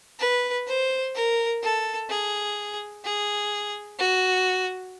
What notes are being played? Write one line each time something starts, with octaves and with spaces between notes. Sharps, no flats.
B4
C5
A#4
A4
G#4
G#4
F#4